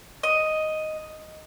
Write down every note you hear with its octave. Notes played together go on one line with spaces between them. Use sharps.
D#5